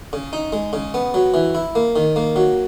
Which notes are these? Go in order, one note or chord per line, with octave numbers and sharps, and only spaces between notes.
C#3
D#4
G#3
C#3
B3
F#3
E3
E4
A#3
D#3
A#3
F#3